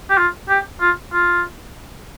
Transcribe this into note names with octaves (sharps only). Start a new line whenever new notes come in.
G4
F4
G4
F4
F4